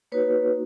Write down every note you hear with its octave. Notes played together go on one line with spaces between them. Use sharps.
A#3 D#4 F#4 B4 C#5